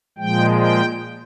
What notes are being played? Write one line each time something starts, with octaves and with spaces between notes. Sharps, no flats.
A#2 F3 G#3 G5
G5